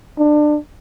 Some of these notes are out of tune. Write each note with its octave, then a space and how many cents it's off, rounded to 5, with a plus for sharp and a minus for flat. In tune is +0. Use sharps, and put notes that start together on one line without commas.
D4 +25